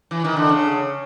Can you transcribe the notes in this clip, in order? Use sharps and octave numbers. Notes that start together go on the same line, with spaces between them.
E3
D#3
D3
C#3